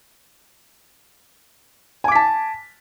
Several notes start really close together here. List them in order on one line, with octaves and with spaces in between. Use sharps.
G#5 D6 B6 A5